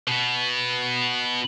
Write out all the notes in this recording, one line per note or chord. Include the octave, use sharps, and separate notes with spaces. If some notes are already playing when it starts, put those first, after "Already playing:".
B2 B3